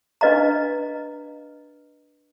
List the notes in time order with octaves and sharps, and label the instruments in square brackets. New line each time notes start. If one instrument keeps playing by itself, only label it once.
[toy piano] D4 B4 D#5 F5 A#5